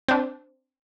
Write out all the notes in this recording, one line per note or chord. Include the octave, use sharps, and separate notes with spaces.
C4 D4